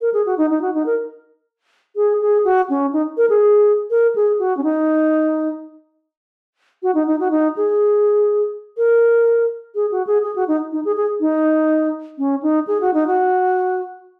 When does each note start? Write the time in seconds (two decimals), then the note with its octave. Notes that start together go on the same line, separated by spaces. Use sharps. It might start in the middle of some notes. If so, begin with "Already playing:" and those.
0.01 A#4
0.14 G#4
0.26 F#4
0.38 D#4
0.50 D#4
0.62 F#4
0.74 D#4
0.86 A#4
1.96 G#4
2.21 G#4
2.44 F#4
2.70 C#4
2.93 D#4
3.17 A#4
3.30 G#4
3.90 A#4
4.15 G#4
4.39 F#4
4.57 C#4
4.64 D#4
6.83 F#4
6.95 D#4
7.07 D#4
7.20 F#4
7.31 D#4
7.56 G#4
8.77 A#4
9.75 G#4
9.91 F#4
10.07 G#4
10.23 G#4
10.36 F#4
10.48 D#4
10.72 D#4
10.85 G#4
10.96 G#4
11.20 D#4
12.18 C#4
12.42 D#4
12.67 G#4
12.81 F#4
12.94 D#4
13.07 F#4